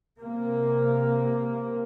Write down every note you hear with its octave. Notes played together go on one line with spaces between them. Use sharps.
C3 A#3